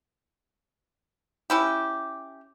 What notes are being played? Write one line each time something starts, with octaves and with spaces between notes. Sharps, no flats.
C#4 E4 G4